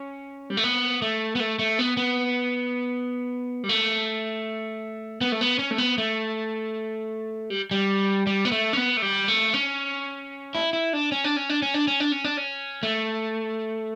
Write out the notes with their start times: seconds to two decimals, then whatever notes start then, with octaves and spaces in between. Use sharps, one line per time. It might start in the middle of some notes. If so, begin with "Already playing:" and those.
Already playing: C#4
0.50 G3
0.57 A3
0.64 B3
1.02 A3
1.35 B3
1.40 A3
1.59 A3
1.79 B3
1.97 B3
3.64 G3
3.69 A3
5.21 B3
5.32 A3
5.41 B3
5.59 C#4
5.71 A3
5.78 B3
5.98 A3
7.50 G3
7.71 G3
8.27 G3
8.45 B3
8.52 A3
8.73 C#4
8.77 B3
8.97 A3
9.02 G3
9.28 A3
9.54 C#4
10.55 E4
10.73 E4
10.93 D4
11.12 C#4
11.24 D4
11.36 C#4
11.49 D4
11.62 C#4
11.74 D4
11.88 C#4
12.00 D4
12.12 C#4
12.24 D4
12.37 C#4
12.83 A3